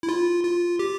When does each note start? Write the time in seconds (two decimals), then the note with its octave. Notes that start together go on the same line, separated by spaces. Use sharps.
0.03 E4
0.09 F4
0.44 F4
0.79 G4